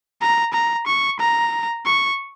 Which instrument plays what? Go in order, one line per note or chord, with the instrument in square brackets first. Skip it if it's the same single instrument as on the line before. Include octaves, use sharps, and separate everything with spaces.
[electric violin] A#5
A#5
C#6
A#5
C#6